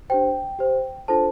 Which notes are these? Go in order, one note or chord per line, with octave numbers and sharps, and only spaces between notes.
D4 G4 C5 G5
G4 C5
D4 F4 A4 C5 A5